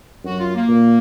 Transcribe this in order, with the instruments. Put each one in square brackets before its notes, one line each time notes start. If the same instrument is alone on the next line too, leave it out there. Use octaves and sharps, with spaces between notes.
[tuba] F#2 [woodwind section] F#4
[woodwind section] F4
A#3
[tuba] A#2